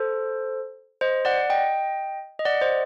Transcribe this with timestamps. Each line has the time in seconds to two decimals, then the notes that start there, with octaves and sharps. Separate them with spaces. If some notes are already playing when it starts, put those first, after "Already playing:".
Already playing: A4 C5
1.01 C5 D#5
1.25 D5 F#5
1.50 D#5 G5
2.39 D#5
2.45 D5 F#5
2.61 C5 D#5